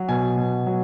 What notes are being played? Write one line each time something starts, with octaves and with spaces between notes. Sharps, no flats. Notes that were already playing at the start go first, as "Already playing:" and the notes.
Already playing: F#3
B2 G#5
B2
F#3